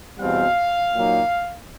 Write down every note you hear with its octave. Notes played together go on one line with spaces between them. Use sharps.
E2 B2 G3 C4 F5
A#2 F#3 A#3 D#4